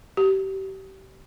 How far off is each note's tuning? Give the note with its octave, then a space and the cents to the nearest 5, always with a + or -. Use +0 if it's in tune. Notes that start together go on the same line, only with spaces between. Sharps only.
G4 -30